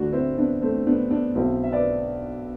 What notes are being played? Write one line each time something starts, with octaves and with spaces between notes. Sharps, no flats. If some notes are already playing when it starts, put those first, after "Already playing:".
Already playing: D2 D3 D4 F#4
C4 E4
B3 D4
A3 C4
B3 D4
B3 D4
B1 B2 C4 E4
E5
B4 D5